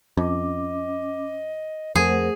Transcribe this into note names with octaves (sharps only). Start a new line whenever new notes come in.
F2 C#4 D#5 D6
F2 A3 G#4 A#4 C5 F#5